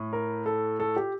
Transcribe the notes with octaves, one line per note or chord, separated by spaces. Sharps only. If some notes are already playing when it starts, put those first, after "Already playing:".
Already playing: A2
A#4
A4
A4
G4